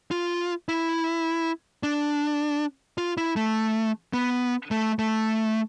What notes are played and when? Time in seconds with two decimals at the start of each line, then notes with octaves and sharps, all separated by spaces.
0.11 F4
0.69 E4
1.83 D4
2.98 F4
3.18 E4
3.36 A3
4.14 B3
4.71 A3
4.99 A3